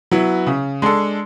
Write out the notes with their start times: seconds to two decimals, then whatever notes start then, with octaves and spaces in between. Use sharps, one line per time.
0.11 F#3 B3 E4
0.47 C#3
0.82 G#3 D4 A4